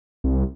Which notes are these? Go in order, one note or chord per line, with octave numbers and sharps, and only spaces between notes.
C2